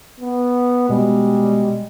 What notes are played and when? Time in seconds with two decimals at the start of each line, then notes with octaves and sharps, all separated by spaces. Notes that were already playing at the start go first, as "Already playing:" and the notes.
0.20 B3
0.89 B2 G3 G#3 B3